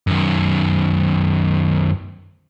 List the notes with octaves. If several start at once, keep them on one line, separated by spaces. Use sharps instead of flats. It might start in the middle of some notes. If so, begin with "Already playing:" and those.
F#2 D#3